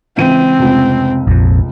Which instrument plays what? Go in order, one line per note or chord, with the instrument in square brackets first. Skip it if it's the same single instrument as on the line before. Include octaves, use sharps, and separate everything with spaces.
[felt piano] C#2 E3 D#7 [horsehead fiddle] C4
[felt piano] F1 C#2
[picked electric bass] A#1 F2